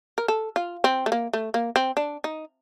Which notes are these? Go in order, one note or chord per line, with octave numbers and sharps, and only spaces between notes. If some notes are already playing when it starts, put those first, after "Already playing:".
A#4
A4
F4
C4
A3
A#3
A3
A#3
C4
D4
D#4